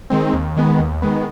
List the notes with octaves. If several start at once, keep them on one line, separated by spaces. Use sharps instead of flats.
D#3 G#3 C4
D#2
D#3 G#3 B3
D#2
D#3 G#3 B3